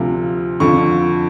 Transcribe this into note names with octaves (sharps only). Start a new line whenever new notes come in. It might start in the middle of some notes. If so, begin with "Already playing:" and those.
Already playing: D2 C3 F3
F2 D3 F3 C#6